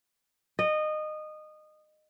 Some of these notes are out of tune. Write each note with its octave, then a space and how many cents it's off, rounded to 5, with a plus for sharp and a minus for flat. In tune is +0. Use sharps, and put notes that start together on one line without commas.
D#5 -20